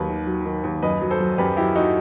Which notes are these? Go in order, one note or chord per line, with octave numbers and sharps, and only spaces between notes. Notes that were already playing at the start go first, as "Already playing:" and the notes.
Already playing: D#2 F#3 G4 B4
D#3
F#3
D#3
D#2
F#2 B4 D#5
F#3
A4 C5
F#3
F#2 G4 B4
F#3 E4 G4
F#3 D#4 F#4